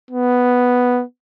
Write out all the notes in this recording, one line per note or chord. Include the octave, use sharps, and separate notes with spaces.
B3